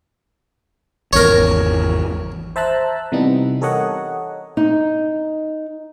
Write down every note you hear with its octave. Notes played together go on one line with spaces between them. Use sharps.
G#1 E2 A#4 C#5
C5 E5 A5 A#5 E6 F#6
C3 E3 G3 B3 D#4
G4 A4 A#4 C#5 D#5 F#5
D#4